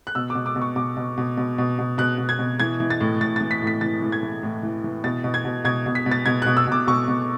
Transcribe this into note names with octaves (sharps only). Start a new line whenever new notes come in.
F#6
B2 E6
D6
B2
D6
B2
C#6
B2 D6
B2
B2
B2
B2
B2
B2 F#6
B2
G#6
B2
E3 G#6
E3
A6
A2
A2 A6
E3 A6
B6
A2
B6
E3 A6
E3
G#6
E3
A2
E3
E3
B2 A6
B2
G#6
B2
B2 G#6
B2
B6
B2
A6
B2 G#6
B2 F#6
E6
B2 D6
B2 C#6
B2